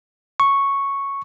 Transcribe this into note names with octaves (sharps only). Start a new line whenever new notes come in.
C#6